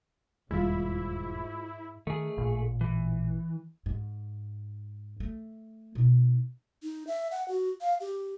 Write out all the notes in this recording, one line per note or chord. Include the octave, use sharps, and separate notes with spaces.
E1 D#2 G#2 G3 G#3 E4 F4
D#3 A3 G#4
A1 A#2
E3
G#2
A3
B2 D#4
D#4
E5
F#5
F#4
F5
G4